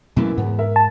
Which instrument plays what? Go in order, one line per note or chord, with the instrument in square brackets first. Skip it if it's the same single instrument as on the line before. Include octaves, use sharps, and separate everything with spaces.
[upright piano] F#2 E3 A#3 [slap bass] B2 F#3 A3
[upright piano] E2 B3 [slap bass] G#2
[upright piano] A#4 E5
[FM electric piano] A5